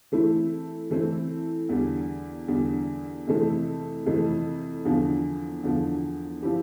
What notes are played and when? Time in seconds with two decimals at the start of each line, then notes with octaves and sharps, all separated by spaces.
0.12 E3 A3 C4 E4
0.90 E3 A3 C4 E4
1.69 E2 D3 G3
2.48 E2 D3 G3
3.27 F2 C3 E3 A3 C4
4.06 F2 C3 E3 A3 C4
4.85 E2 D3 F3
5.64 E2 D3 F3
6.42 F3 C4 E4 G4